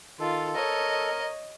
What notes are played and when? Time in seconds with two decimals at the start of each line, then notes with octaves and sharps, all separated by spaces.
0.20 D#3 F4 A4
0.56 A#4 C#5 D#5